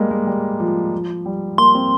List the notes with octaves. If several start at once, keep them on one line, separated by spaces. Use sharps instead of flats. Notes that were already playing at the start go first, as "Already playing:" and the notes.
Already playing: G3 G#3 A#3
G#3
G3
F3
F3
G3
A#3 C6
C4